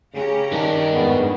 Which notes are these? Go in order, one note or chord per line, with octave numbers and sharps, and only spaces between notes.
C#3 C#4 G4 A#5
G2 D#3 D4
F2 G#2 C#3 B3